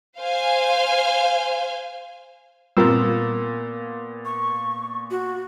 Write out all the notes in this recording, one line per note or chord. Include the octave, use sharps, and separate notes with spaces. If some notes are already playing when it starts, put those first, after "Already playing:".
C5 F5 G#5
A#2 G3 B3 C4 F4 A#4 E6
C#6
F#4